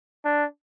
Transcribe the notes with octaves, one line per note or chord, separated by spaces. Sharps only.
D4